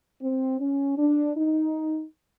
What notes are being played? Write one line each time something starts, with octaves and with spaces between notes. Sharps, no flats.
C4
C#4
D4
D#4